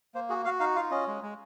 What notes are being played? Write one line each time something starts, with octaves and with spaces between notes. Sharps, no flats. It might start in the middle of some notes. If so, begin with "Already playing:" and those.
A#3 C5
F#4 G#4
F#4 F5
D#4 F5
F4 F5
C#4 D#5
G#3
G#3